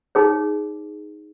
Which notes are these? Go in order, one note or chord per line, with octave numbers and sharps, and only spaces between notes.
D#4 G#4 C#5